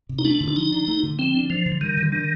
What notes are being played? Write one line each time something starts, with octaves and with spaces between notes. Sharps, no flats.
C3
D#4
A3 D4
D3
D4
F3 D#4
D4
A3
D3
F3 C4
D4
F3 D4
D3
D#3 G3
D3
D#3 D4